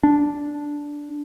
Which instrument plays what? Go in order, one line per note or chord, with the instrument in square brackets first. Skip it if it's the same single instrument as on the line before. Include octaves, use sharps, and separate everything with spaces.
[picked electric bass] D4